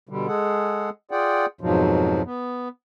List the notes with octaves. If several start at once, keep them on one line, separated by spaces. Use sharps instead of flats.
B2 D3 G3
G#3 G#4 A4 F#5
F4 G#4 D5 F#5 G5
F2 G#2 B2 F3 F#3
B3